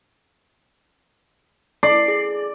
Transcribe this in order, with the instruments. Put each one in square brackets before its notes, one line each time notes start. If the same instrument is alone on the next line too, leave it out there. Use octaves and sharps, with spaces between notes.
[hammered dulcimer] D5 [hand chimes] C7
[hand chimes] G#4